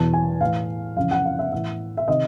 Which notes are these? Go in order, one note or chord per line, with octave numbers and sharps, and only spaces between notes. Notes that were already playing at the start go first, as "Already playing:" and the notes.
Already playing: E2 B2 A5
G#5
A2 E3 F5
F2 C#3 E3 F5
F#5
F5
E5
A2 E3 E5
E5
C3 D#3 D#5